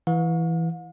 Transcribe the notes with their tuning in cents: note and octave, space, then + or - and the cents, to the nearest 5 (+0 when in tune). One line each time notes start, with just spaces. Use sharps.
E3 +0 F5 +45